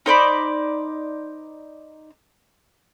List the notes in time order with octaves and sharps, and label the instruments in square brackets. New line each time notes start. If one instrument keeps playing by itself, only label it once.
[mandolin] D#4 C5 D5 B5